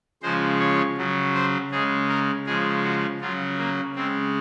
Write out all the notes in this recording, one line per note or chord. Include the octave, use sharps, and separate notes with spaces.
C#3 F3 G#3 C5
C#5
C#3 F#3
C5
C#3 G#3 G#4
A#4
C#3 F3 G#3 G#4
F#4
C#3 F#3 F4
A#3
C#3 G#3 C4